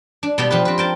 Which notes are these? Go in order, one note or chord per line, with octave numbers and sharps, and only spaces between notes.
D4
B2 G3 B3 D5 G5
F3 G4 B4
C4 B4
A#4 G5 A5